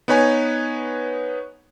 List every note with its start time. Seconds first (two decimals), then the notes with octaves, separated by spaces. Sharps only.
0.08 B3 D#4 B4 C#5 G#5